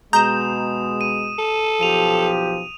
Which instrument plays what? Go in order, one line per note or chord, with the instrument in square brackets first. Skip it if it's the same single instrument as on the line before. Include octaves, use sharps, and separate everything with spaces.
[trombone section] B2 G#3 [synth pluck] A#5 G6 [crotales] D#6 E7
[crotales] D#7
[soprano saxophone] A4
[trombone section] B1 F3 G4 [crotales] D#7 F7